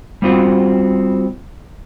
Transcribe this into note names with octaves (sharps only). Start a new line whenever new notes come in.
G3 B3 C4 F4 F#4